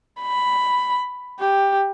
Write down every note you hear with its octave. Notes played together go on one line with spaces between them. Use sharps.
B5
G4